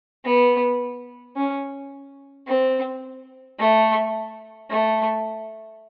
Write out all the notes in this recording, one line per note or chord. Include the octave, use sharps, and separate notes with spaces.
B3
C#4
C4
A3
A3